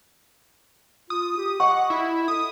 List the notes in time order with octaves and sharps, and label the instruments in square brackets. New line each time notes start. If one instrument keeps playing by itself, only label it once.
[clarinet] F4 [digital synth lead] D#6
[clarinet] G4
[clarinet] D#5 [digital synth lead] F#5 [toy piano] C#6
[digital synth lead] E4
[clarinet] A4 [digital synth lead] D#6